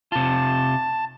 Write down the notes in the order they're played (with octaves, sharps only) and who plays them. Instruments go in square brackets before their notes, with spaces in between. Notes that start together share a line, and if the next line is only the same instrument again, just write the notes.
[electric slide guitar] C3 F4 [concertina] A5